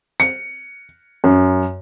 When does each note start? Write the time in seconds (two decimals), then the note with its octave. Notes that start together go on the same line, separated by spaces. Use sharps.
0.20 C#7
1.24 F#2